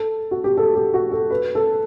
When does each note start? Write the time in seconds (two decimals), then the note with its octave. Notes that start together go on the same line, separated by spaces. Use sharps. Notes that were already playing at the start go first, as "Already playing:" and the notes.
Already playing: A4
0.31 F#4
0.44 G4
0.57 A4
0.75 G4
0.94 F#4
1.12 A4
1.30 B4
1.55 A4